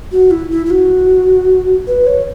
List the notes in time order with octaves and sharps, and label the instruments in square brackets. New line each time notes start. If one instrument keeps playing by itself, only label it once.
[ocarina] F#4
E4
E4
E4
F#4
B4
C#5